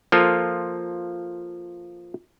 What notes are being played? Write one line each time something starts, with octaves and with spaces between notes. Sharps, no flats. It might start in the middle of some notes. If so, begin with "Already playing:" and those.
F3 A#3 F4 A4